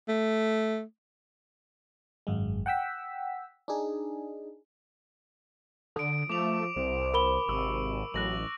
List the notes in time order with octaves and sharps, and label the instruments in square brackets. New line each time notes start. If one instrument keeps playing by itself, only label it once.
[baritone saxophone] A3
[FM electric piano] G#1 F#2 G#3
F#5 G5 E6 B6
D4 D#4 G#4
[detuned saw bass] D3 [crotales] D#6 D7
[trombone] F3 [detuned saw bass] A3 [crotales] D6 F7
[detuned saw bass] C2 [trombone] C5
[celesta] A#4 B5 G7
[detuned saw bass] G#1 [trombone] C3 [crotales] C#6 E6
[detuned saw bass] A1 [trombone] F#3 [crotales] F#6 A#6 F#7